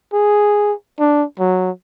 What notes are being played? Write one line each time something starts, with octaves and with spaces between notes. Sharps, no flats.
G#4
D4
F#3